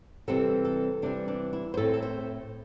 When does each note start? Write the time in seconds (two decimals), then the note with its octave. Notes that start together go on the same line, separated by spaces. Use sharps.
0.28 C3 E3 G3 C4 A4
0.65 A4
1.02 C3 E3 G3 D4
1.28 D4
1.53 E4
1.74 C5
1.77 A2 A3 C4 A4
1.94 A4
2.02 C5